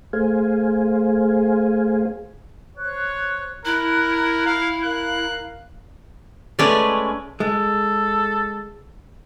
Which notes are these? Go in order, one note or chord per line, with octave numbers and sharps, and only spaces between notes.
A3 G#4 C5 F5 G#5
C5 C#5 F#6
E4 A#4 F#6
F5
A#4 F5 F#6
G#3 A3 C#4 B4 D5
G#3 A4